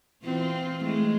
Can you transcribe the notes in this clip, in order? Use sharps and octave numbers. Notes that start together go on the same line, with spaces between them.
E3 C4 F4
G#3 A3